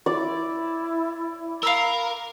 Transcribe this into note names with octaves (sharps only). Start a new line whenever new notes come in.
E4 D5
A#4 F5 B5 E6